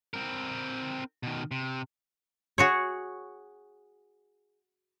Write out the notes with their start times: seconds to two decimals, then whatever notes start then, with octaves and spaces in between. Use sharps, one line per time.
0.14 C4 A#4
1.23 B2 D#3
1.51 C3
2.58 F#4 G#4 C#5